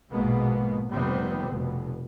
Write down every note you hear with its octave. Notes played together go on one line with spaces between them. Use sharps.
A#1 G#2 B2 G#3 A#3 B3
F1 C3 D#3 G3 B3 C4
F1 B2